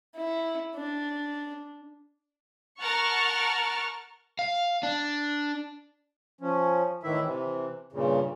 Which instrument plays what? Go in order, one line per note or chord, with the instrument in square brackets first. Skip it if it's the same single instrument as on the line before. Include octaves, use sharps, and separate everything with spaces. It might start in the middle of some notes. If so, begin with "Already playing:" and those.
[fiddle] E4
D4
[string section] A#4 F#5 A5 C#6 F6
[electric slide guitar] F5
D4
[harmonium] F3 C#4
A2 D#3 E3 E4 E5
C3 E3
G2 A#2 C#3